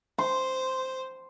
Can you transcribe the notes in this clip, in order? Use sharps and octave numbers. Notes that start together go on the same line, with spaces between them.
C5 C6